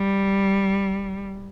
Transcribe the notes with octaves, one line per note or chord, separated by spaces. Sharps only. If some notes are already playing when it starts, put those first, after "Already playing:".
Already playing: G3